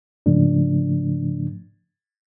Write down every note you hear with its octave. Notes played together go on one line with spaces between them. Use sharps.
G#2 C#3 F3 A3 D4